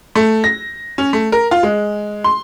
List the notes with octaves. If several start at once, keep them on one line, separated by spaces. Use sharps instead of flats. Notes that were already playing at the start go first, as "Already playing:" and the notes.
A3
A#6
C#4
A3
A#4
F4
G#3
C6